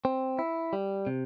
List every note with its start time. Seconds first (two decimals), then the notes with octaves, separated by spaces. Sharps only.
0.05 C4
0.39 E4
0.73 G3
1.07 C3